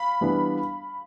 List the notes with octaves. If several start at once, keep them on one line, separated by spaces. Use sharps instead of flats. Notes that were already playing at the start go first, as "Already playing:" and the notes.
Already playing: F5 B5
E3 G3 B3 D4